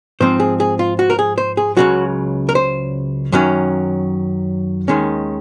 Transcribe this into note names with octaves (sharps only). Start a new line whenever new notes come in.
G#2 F3 C4 C5
G#4
G#4
F4
F#4
A#4
G#4
C5
G#4
C#2 C#3 F#3 F#4
A#4
C5
F#2 D#3 F#3 C#4
D#2 D#3 G#3 C#4